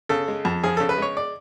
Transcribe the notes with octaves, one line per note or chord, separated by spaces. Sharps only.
C#3 A4
G#3
F2
F3 G#4
C#3 A4
B4
G#3 C#5
D5